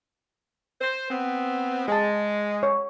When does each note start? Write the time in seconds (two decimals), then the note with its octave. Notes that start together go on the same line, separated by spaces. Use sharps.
0.81 C5
1.10 B3 C4
1.88 G#3 G#4 A5
2.63 C#5